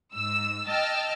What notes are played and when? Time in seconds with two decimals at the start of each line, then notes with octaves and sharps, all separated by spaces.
0.14 G#2 E6
0.68 D#5 G5 A5 E6 F6 A6